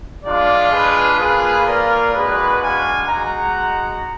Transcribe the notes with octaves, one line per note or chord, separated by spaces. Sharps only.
G#3 D4 F4 D5 F5
G#4 B4
A#3 F4 G#4 B4
A#4 D5
G#3 D4 F#4 G#4 B4
F5 G#5
G#3 D#4 F#4 F#5 A#5